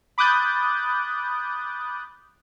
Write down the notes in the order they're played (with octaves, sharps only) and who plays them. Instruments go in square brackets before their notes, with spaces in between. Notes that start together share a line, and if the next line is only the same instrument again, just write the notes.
[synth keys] B5 D6 D#6 F#6 G6 A6